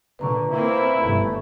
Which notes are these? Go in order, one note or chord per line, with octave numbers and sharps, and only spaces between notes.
A#2 D3 B4 A#5 C#6
A#2 A#3 C4 E4
G1 G2 A3